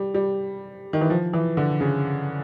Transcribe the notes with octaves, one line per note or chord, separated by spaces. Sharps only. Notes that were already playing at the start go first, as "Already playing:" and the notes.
Already playing: G3
G3
D#3
E3
F3
E3
D3
C#3